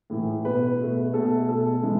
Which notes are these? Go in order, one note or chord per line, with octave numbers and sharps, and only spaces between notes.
A2 E3 A3
B2 A3 B4
B2 A3
B2 A3 A4
B2 A3 A4
E3 G#3